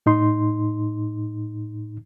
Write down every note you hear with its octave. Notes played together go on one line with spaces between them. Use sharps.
A2 D#4 C6